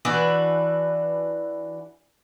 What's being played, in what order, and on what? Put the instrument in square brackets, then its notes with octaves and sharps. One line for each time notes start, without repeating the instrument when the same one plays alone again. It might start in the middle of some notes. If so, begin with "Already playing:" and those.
[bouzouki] E3 D4 F#4 B4